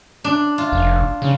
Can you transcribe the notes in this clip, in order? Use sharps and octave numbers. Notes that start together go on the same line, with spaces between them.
D4
F4
F1
C#3